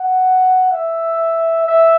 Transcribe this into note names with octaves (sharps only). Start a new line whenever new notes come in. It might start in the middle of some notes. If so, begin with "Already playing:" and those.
Already playing: F#5
E5
E5